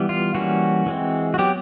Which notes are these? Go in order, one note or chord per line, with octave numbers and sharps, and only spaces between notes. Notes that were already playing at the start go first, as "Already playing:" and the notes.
Already playing: E3 G3 B3
F4
E3 G3 A#3 C#4 F#4
E3 G#3 C4
F#4
F#3 B3 G4